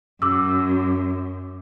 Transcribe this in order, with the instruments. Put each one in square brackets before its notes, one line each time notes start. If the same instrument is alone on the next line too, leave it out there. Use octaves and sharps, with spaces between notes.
[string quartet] F#2 [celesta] D6 E6